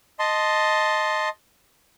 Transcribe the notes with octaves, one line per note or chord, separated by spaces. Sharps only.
D#5 A5 C6